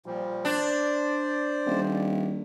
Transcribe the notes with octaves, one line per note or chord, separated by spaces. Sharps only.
A#2 F3 G3
D4 C5 D5
D#1